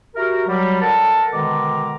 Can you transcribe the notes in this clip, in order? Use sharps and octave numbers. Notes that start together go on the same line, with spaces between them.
E4 F#4 G4 A#4
F#3 G3
D4 A4 A#4 F#5 A5
B2 D3 D#3 G#3 A#5 D6